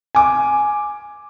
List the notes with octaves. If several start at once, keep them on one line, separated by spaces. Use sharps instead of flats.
G#5 D6